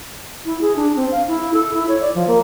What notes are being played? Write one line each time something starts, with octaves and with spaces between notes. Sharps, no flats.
E4
G#4
D4
C4
F5
E4
A4
E4
C#5
D5
F3
A#3